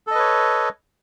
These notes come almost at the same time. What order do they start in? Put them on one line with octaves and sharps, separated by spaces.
A4 D#5 B4 C#5